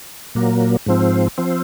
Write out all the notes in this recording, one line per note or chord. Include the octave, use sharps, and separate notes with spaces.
A#2 F#3 A#3
G#2 F3 C4
F3 C4